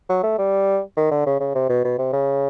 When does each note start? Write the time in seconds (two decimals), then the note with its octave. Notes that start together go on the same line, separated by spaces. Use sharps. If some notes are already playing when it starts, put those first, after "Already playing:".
0.09 F#3
0.23 A3
0.38 G3
0.97 D#3
1.11 D3
1.26 C#3
1.40 C#3
1.55 C3
1.69 B2
1.84 B2
1.98 C3
2.13 C#3